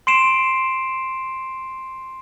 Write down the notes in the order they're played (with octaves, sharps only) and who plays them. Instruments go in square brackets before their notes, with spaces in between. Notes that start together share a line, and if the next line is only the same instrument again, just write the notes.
[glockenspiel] C6 C7 D7 E7